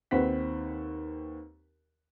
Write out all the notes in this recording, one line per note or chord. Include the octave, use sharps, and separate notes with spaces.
D#2 C4 B4 F#5 B6